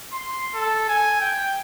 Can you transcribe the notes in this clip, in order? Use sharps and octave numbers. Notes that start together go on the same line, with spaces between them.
C6
A4
G#5
G5